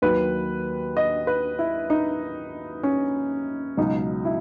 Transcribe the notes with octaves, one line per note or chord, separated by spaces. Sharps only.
D#2 D#3 F#3 B4
D#5
B4
E4
D#4
C#4
C#2 B2 F#3 D#4
E4